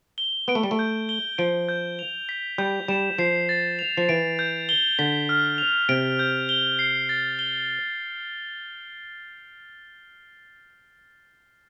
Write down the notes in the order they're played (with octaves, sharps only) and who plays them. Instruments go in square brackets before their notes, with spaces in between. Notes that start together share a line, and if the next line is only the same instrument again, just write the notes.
[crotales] G7
[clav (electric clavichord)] B3 [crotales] D7
[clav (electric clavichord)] A3
G3
A3
[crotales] G6
G7
[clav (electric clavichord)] F3 [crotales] D7
[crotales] G6
F7
B6
[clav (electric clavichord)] G3 [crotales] G6
[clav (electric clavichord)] G3 [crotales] E7
[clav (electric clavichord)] F3 [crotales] C7
[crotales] A6
F7
[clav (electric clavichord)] F3
[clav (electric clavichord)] E3 [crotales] D7
[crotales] G6
G7
[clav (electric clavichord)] D3 [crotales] B6
[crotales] F6
F7
[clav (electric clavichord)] C3 [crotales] D7
[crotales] G6
G7
C7
A6
G7